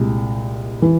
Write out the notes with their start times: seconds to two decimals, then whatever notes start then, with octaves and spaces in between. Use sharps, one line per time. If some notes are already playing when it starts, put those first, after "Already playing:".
Already playing: C2 A#2 G#3
0.82 E3